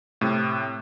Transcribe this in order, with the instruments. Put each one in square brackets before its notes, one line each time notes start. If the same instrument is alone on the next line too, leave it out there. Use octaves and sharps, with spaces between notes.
[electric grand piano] A2 C3